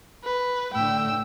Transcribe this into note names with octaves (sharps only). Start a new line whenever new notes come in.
B4
A2 D3 G5 E6